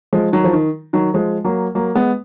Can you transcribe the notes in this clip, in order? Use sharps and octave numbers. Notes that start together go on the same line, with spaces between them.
F3 G#3
D#3 F#3
F3
D#3
D#3 F#3
F3 G#3
F#3 A#3
F#3 A#3
G#3 B3